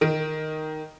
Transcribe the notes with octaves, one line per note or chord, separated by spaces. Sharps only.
D#3 D7